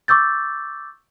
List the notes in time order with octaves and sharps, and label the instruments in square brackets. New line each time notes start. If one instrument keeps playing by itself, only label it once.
[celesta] C#6 D6 E6 G6 A6